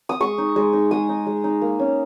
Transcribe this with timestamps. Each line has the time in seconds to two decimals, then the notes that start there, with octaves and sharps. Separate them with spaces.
0.09 D#6
0.20 G#3 C#6
0.38 D#4
0.56 G#3
0.73 D#4
0.91 G#3 D#6
1.09 D#4
1.26 G#3
1.44 D#4
1.62 A#3
1.79 C#4